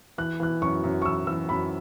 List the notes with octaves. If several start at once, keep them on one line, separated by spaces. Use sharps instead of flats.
E3 F#6
E3 F#6
F#2 C#6
F#2
C#6
E3 E6
E3 E6
F#2 B5